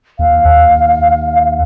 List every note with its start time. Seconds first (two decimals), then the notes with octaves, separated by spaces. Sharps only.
0.19 D#2 F5
0.45 D#2